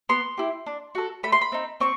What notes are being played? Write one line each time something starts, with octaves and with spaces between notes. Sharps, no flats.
B3 C6
E4 G4
D4
F#4 A4
A3 B5
C6
B5
C4 D#4
C4 C#6